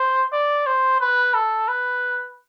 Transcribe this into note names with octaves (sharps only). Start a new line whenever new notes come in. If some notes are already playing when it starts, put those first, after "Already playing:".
Already playing: C5
D5
C5
B4
A4
B4